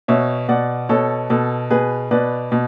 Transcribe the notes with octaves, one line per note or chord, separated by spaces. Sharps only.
B2 C#5 E5
B2 D5 F#5
B2 A4 C#5
B2 A4
B2 G#4 B4
B2 B4 D5
B2